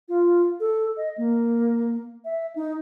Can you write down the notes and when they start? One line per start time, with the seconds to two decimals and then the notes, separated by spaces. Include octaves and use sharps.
0.09 F4
0.60 A4
0.97 D#5
1.18 A#3
2.25 E5
2.56 D#4